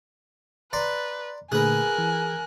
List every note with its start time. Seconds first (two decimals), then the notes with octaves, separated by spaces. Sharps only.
0.73 B4 D5 A#5 C6
1.52 A#2 D3 A3 G#4 A#4 B4 G#5 F#6
1.98 E3